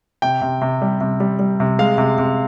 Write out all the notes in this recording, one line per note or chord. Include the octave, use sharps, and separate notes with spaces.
C3 G5
C3
C3
G3
C3
G3
G3
C3
G#3 F5
C3
C3